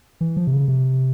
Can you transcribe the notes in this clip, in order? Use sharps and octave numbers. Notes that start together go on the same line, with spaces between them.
E3
F3
C3
C#3
C3